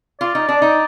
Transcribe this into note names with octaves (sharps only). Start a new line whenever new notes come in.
F4 D5
D#4
D4
D#4